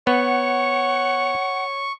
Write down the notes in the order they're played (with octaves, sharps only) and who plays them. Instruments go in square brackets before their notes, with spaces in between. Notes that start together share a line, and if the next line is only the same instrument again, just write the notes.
[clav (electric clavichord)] B3 [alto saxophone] C#5 [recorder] F#5 [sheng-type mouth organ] C#6